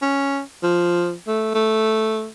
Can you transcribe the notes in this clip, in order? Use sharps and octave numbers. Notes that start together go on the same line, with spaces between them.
C#4
F3
A3
A3